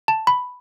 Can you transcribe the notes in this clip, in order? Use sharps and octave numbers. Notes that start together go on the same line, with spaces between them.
A5
B5